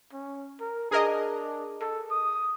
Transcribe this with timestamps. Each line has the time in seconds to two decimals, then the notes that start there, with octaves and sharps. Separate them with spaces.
0.13 C#4
0.61 A#4
0.91 D4 G#4 A#4 D#5
1.81 A4
2.11 D#6